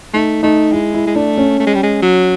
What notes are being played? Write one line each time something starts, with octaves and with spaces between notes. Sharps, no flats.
A3 D#4
A3 D#4
G#3 E4
E4
G#3
A3 D4
C#4
A3
G#3
G3
G#3
F#3